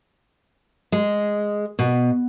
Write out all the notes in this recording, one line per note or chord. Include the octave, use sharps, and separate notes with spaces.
G#3
B2